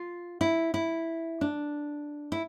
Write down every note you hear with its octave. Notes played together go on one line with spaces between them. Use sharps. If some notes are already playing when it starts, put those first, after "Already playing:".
Already playing: F4
E4
E4
D4
E4